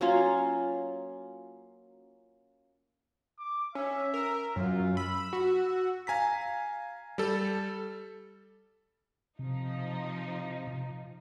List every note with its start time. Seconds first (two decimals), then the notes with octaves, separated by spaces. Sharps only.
0.01 F#3 A#3 C#4 F4
3.39 D6
3.75 C#4 E5
4.14 A#4
4.56 F#2 F4
4.97 B5 E6
5.33 F#4
6.07 F5 G#5 A#5 B6
7.18 G3 A4
9.39 C3 F3 D#4